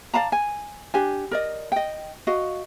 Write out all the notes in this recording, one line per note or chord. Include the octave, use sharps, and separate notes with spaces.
D5 F5 A5 A#5
G#5
D4 G4 G#5
A#4 D5 D#5
D#5 G5
F#4 D#5 F5